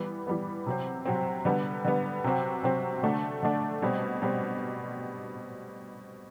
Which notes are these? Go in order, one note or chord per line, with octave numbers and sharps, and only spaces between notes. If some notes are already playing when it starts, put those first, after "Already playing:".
Already playing: E3 G3 B3
E3 G3 B3
C3 F#3 C4
C3 F#3 C4
D3 G3 B3
D3 G3 B3
C3 F#3 C4 F#4
C3 F#3 C4 F#4
D3 A3 D4
D3 A3 D4
B2 G3 C4
B2 G3 C4